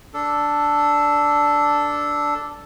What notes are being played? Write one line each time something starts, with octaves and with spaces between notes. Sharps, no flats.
D4 A4